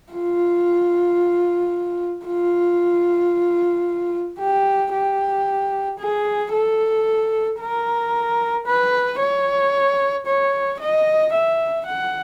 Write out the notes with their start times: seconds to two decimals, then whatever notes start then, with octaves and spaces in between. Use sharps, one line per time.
0.12 F4
2.26 F4
4.39 G4
4.92 G4
5.99 G#4
6.52 A4
7.60 A#4
8.66 B4
9.20 C#5
10.26 C#5
10.80 D#5
11.33 E5
11.86 F#5